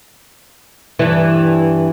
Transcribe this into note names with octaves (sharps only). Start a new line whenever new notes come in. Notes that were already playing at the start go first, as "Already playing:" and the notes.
G2 E3